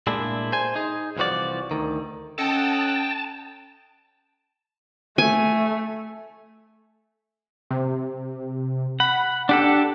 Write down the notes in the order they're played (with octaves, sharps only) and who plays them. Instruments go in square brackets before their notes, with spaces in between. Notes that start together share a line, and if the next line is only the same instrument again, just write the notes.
[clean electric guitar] A#2 G#3 A3 D4 E4
C5 G#5
D#4 G#4
C2 E3 F3 F#4 D5
D2 D#3
[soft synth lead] C#4 [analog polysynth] A4 D#5 F#5 [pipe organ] G5 [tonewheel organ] A5
[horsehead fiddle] A3 [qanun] G#5
[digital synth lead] C3
[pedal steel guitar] F#5 [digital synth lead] B5
[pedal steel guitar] D4 G4 A4 [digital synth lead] F#5